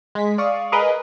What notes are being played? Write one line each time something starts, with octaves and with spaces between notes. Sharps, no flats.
G#3 B6
D5 F5 C#6 D#6
G#4 A#4 B4 D#5